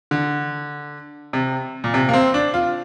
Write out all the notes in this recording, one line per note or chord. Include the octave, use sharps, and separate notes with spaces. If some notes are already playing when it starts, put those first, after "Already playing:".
D3
C3
A#2
C3
A#3
C4
D4
F4